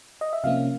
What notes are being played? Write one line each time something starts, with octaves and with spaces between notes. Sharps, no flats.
D#5
E5
C3 F3 A#3 C#4 F5